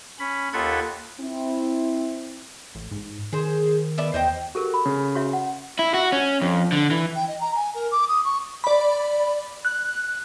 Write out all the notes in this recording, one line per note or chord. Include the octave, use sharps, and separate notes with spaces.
C#4 B5
D#2 F4 A4 F#5 B5 G#6
C4 E4
A1
G#2
D#3 G#4 C5
B3 D5 E5
E2 C5 D#5 G5
F#4 G4 A4 A#4
B5
C#3
F#4 C#5 E5
F#5
E4
F#4
C#4
F2
D3
E3
G5
D#5
A#5
G#5
A#4
D6
D#6
C#6
D5 B5
F#6